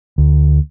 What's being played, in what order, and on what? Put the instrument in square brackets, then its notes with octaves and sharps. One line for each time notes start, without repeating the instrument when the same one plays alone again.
[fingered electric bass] D2